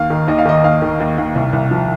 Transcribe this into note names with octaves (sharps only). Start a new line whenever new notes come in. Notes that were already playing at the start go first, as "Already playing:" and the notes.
Already playing: D#2 F5
D#3
D#2 D#5
F5
D#3 D#5
D#2 F5
D#3
D#2
D#2
C2
C2
F3